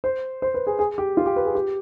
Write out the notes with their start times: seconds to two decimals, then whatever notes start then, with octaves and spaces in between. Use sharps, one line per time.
0.04 C5
0.42 C5
0.54 B4
0.67 G#4
0.79 G#4
0.98 G4
1.17 F4
1.26 G4
1.36 B4
1.45 G#4
1.55 G4